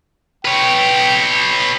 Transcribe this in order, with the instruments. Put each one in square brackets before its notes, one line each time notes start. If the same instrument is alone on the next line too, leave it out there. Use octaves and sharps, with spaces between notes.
[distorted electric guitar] B4 C#5 [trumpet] G5